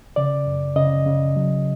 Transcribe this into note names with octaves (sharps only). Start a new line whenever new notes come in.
C#3 D5
F#2
C#3 D#5
C#3
F#3